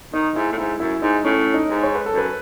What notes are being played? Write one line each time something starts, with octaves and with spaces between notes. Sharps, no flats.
D#3 D#4
G#2 E4
A2
G#2 E4
F#2 E4
G#2 D#4
A2 C#4
D#4
G#2
C#5
B4
A4
F#2 B4